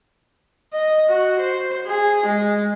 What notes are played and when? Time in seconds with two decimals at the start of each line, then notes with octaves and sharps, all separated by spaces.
0.73 D#5
1.10 F#4
1.40 C5
1.86 G#4
2.26 G#3